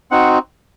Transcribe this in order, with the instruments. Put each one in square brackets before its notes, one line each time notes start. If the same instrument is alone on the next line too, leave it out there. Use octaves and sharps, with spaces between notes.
[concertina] C4 D#4 F#4 F#5